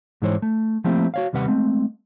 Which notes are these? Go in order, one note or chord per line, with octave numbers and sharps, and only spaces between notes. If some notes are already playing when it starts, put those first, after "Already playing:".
G#2 E3 G#3 E4 C5 C#5
A3
F3 A3 A#3 C4 E4 G4
F#4 C#5 F5
D#2 C3 G3 B4 F#5
G#3 A3 C4